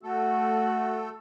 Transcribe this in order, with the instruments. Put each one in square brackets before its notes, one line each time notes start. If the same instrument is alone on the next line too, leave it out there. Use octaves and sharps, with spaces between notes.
[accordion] A3 A4 [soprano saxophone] F#4